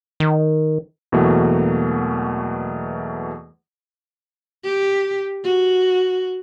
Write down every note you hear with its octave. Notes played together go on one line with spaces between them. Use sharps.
D#3
E2 B2 E3 F#3 A3 A#3
G4
F#4